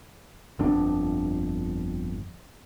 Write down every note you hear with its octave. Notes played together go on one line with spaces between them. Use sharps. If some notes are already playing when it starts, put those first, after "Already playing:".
G1 F2 D4